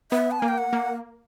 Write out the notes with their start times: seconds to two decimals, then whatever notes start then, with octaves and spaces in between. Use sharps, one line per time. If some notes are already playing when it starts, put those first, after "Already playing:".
0.12 B3 E5
0.31 A5
0.40 A#3 G#5
0.48 G5
0.58 F#5
0.73 A#3